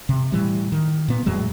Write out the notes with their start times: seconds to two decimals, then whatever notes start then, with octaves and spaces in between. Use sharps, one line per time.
0.09 C3
0.32 A2 E3 G3
0.72 D#3
1.08 A#2 B3
1.26 E2 A2 F#3 G#3